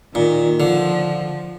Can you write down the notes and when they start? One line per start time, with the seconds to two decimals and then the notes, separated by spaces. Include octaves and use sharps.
0.14 A#2 D#3
0.60 D3 F3